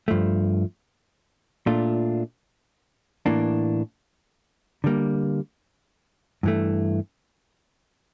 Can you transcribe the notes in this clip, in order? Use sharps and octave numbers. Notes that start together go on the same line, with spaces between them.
G2 F3 A3
A#2 A3 D4 F4
A2 E3 A#3 D4
D3 G3 A#3
G2 E3 A3